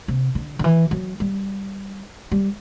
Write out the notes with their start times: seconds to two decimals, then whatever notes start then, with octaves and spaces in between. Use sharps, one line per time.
0.08 C3
0.35 D3
0.59 D3
0.64 E3
0.91 F#3
1.20 G3
2.32 G3